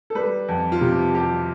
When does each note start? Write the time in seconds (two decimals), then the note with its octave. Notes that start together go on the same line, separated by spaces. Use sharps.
0.10 A4
0.15 G3 B4
0.49 F2
0.72 F4
0.81 C3 G4
1.14 F2 G4